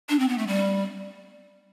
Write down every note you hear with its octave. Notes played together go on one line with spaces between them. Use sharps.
D4
C4
B3
A3
G3